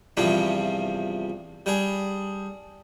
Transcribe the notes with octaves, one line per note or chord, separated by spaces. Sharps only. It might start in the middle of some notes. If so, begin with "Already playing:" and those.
E2 G2 C3 F3 G3 D4
G3 D4 G#4